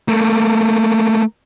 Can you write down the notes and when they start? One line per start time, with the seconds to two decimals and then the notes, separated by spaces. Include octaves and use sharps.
0.08 A3 A#3